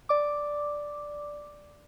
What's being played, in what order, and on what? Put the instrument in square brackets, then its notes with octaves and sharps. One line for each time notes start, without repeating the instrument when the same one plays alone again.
[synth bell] D5 D6